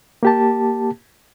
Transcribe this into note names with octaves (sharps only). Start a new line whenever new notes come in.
A#3 G4 A5